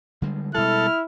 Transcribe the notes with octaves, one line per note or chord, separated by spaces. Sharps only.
D3 G3 G#3
B2 G3 G#3 E4 A4 F6